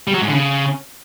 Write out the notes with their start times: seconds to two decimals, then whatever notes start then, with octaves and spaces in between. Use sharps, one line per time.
0.07 G3
0.14 F#3
0.21 G#2
0.28 D3
0.34 C#3